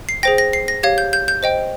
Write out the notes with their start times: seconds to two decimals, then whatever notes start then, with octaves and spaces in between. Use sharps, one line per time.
0.09 C7
0.23 G#4 C5 G5 A#6
0.38 A#6
0.53 C7
0.68 A#6
0.83 G4 C#5 F5 G#6
0.98 G6
1.13 G6
1.28 G6
1.43 C5 D#5 G5